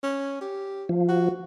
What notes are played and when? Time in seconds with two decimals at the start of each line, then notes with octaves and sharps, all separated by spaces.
0.03 C#4
0.41 G4
0.89 F3
1.09 F#4